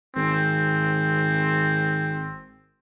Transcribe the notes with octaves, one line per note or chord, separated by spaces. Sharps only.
G#1 C4